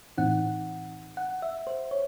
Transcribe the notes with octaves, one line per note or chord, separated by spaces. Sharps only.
A2 E3 C4 D#4 F#5
F#5
E5
C5
C#5